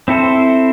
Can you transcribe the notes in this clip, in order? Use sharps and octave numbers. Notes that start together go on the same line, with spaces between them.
C4 E4 A4 C5